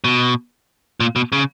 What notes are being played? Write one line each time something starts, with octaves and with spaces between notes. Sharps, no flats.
B2
A#2
B2
C#3